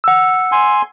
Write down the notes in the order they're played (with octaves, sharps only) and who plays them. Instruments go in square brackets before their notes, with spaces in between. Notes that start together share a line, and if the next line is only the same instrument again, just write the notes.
[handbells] F#5 E6
[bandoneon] G#5 C6